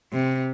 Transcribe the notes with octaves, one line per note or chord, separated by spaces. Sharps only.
C3